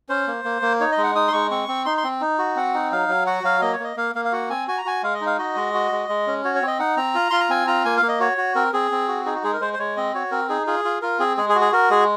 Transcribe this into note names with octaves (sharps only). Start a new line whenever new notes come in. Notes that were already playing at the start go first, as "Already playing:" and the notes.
C#4 C5
A#3
A#3
A#3
D#4 C#5
D#5
G#3
F#5
D#4 D#6
C6
G#3 C#6
C4 C#6
C4
D#4 C6
C6
C4
D#4
F#4
C4 F#5
D#4
F#3 F5
F#3
F#4 F#5
F#3 F5
A#3 D#5
C#5
A#3 D#5
A#3 F5
A#3 F5
F5
F#4 F#5
C4 G#5
F#4 G#5
A#5
F#4 G#5
G#3 F5
D#5
D#4
F5
F#4 D#5
G#3
F#4
G#3
G#3
C#4
F#4 C#5
C#5
C4
D#5
D#4 F#5
C4 A#5
F4
F4 C6
A#5
C4 G#5
F4 A#5
A#3 G#5
F5
A#3
D#5
F#4 C#5
F#4
C4 A#4
C4 G#4
C4
F#4
D#4 G#4
F#4
G#3 G#4
A#4
G#3 C5
C5
G#3 C#5
C4 D#5
F#4 C#5
C4 A#4
D#4 G#4
F4 G#4
F4
F4 A#4
C4 G#4
G#3 G#4
G#4
F#4
G#4
F#4 A#4
G#3 G#4